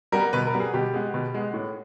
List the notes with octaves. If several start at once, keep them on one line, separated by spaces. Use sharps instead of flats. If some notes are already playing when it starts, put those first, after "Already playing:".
G3 B3 A#4
B2 B4
A#4
G3 B3
G#4
B2 G4
G#3 B3
B2
G#3 B3
A2